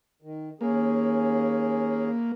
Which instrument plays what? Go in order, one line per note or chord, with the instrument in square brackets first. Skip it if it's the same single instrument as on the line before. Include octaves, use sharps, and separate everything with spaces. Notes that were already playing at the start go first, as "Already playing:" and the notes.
[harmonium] D#3
[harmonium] D#2 C#4 G#4 [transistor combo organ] A#3